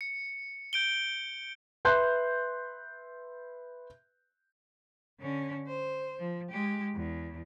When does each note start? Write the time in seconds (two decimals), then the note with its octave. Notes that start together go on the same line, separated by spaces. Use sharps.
0.01 C#7
0.73 G6 D7 G7
1.85 B4 E5 C6 F#6 G6
5.19 D3 C#4
5.67 C5
6.19 F3
6.50 G#3 G4
6.95 E2